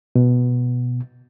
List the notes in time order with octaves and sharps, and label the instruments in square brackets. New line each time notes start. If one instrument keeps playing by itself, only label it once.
[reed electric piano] B2